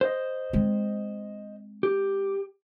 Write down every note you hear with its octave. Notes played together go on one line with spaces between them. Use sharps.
C5 D#5
G#3 C4
G4